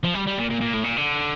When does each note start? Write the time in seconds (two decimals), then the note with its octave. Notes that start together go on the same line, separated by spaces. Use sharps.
0.04 F3
0.14 G3
0.27 G3
0.38 A#2
0.50 A#2
0.60 A#2
0.73 A2
0.84 A#2
0.97 D3